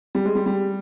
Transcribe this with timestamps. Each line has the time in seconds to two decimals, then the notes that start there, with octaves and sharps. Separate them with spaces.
0.15 G3
0.25 G#3
0.35 G3
0.46 G3